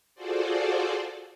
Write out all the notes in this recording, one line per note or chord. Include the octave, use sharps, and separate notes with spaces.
F4 F#4 G#4 A4 C5 D5